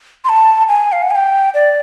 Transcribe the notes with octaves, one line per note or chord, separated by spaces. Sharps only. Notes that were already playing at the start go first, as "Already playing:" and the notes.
C6
A5
G#5
F5
F#5
G#5
G5
D5